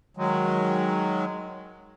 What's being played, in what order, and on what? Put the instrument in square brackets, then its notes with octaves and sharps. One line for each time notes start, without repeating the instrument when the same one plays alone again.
[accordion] D#3 F#3 G#3